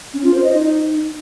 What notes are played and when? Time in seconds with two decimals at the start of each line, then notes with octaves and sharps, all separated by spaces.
0.14 C#4
0.24 F4
0.34 C5
0.44 D#5
0.54 D#4